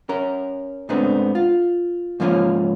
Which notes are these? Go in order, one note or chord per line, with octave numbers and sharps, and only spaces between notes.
C#4 A#4
G#2 A3 B3 C4 D4 D#4
F4
G#2 F3 A#3 C#4 F4